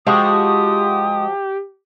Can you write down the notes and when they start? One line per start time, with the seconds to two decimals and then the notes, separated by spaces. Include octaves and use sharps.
0.07 F3 G#3 F#4 G4 D#6